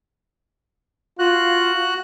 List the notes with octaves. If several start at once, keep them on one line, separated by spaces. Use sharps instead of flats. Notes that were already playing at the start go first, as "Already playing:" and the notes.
F4 F#4 F#6